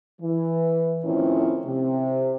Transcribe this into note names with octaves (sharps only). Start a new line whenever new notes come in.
E3
A2 D#3 F3 C4 C#4 E4
C3